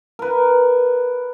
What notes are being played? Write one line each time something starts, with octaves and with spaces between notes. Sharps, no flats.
A#4 B4